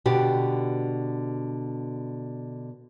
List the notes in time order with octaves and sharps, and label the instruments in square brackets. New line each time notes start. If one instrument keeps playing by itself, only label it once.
[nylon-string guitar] B2 D3 F#4 G4